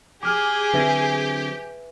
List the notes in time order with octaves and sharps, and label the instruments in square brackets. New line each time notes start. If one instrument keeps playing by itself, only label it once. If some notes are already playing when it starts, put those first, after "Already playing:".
[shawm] G4 [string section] G#4 [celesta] D6 F6
[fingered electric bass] D3 F#3 C4 [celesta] B4 E5 A#6